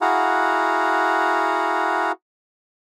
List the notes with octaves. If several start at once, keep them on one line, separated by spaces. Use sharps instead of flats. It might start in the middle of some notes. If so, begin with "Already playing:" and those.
E4 F#4 G#4 F5 F#5 A#5